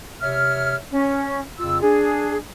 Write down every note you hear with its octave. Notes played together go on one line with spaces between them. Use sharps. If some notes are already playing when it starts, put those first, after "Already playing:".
C3 C#5 E5 F6
C#4
F2 C#3 F4 E6
D4 G#4